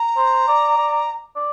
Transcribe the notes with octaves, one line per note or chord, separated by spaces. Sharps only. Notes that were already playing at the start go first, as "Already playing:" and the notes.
Already playing: A#5
C5
D5
D5
D5